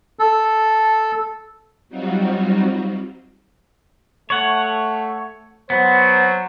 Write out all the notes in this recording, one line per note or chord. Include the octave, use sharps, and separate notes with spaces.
A4
F#3 G3 C4 D#4 F4 F#4
A3 C#5 F#5
F#3 B3 C5